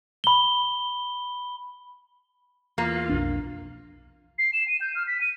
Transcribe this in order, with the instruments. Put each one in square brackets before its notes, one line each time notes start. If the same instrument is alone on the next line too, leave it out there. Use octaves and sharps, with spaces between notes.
[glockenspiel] B5 G7
[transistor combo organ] E2 F4 [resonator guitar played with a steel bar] A#3
[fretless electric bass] B1 F2 D4
[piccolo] C7
E7
D#7
G6
F6
B6
D#7